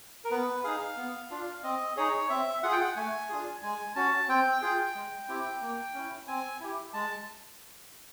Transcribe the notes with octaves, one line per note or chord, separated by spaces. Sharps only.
A#4
B3 B4
D#4 G#4 F5
B3
D4 F4
C4 D#5
D#4 G#4 C#5
C4 E5
F4 G#4 F#5
G5
F#5
A3 G#5
D4 F4 G#4
G#3 G#5
C#4 F#4 A5
C4 G5
F4 G#4 G5
G#3
C4 E4 G4
A#3
C#4 E4
C4 G#5
E4 G4
G#3 A5